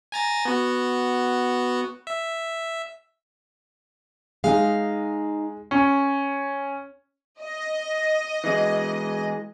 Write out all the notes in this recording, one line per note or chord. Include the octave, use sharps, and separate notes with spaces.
G#5 A#5 A6
B3 F#4
E5
G#3 D#4 F5
C#4
D#5
E3 G#3